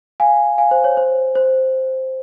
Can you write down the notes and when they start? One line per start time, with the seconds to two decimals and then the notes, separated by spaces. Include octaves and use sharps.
0.20 F5 G#5
0.58 F5 G#5
0.71 C5
0.84 C#5
0.97 C5
1.35 C5